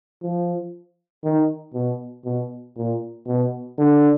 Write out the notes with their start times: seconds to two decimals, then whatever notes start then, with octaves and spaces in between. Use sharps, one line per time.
0.23 F3
1.24 D#3
1.74 B2
2.25 B2
2.77 A#2
3.27 B2
3.78 D3